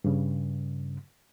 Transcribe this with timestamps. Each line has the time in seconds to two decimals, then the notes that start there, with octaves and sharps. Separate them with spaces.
0.04 G2 C#3